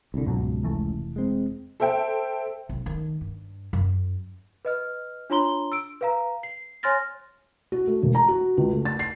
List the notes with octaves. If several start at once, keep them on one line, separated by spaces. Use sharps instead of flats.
C2 D3
C#2 G#2 B2 F#3
F1 E3 A3
G#3 C4
A4 C5 E5 G5
B1
D#3 A3
G2
F#2
B4 D#5 F6
D4 F4 C#5 A#5 C6 G7
E6 D7
B4 F5 A#5
C7
C#5 G#5 C6 F6 A6 A#6
F#4
A3
E1
A#5
F#4
C#2
A3
A6
C7